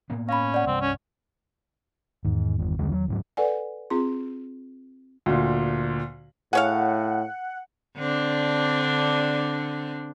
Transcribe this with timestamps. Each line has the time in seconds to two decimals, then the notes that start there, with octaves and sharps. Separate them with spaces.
0.10 A2 A#3 B3
0.29 C#4 F5 B5
0.54 D5 F#5
0.67 C2 G2 C3 C4
0.81 C#4
2.25 E2 G#2 D#3
2.59 G1
2.79 C2 D3 G#3
2.92 F#3
3.08 D2 G#2 F#3
3.37 A4 B4 D5 F#5 G#5
3.90 C4 F4 G#4 C6
5.26 D2 A#2
6.53 A2 G#4 C#5 F5 F#5
7.97 D3 C4 D4